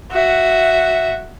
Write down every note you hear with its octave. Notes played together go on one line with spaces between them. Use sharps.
F#4 E5